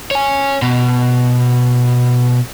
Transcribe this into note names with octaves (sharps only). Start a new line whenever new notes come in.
C#5 G#5
B2